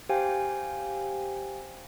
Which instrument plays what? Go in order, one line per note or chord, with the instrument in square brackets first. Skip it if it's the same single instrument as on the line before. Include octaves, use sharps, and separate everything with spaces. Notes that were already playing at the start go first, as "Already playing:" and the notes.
[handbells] G4 C5 F5 G5 G#5